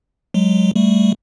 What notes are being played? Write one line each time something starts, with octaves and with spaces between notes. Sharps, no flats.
F#3 G#3
G3 A3